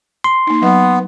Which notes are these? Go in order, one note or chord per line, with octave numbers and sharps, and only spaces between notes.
C6
A#3 D#4
F#3 B3 D#5